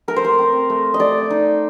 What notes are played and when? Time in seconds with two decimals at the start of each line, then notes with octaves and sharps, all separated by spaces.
0.08 A3 A#4
0.16 C5
0.24 A#4
0.39 C4
0.70 A3
0.94 D#5
1.00 A3 D5
1.30 D#4